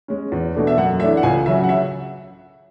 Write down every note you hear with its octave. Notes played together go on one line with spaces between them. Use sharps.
G#3 C#4
E2
B2 A3 D4
E5
F#2 F#5
E3 A3 D4 E5
F#5
C#2 G#5
C#3 F#3 C#4 E5
F#5
E5